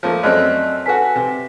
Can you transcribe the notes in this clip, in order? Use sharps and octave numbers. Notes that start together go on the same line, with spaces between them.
F3 A3 A#3
F#2 A3 C4 D5 D#5 F#6
F#4 A4 B4 G#5 B6
C3